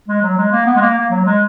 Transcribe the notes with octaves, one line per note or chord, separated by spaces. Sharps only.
G#3
F#3
G#3
A#3
B3
G#3
A#3
A#3
F#3
G#3